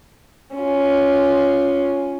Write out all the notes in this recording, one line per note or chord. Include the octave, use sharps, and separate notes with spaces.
C#4 F4